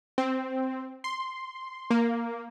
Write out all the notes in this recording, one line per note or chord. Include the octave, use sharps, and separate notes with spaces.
C4
C6
A#3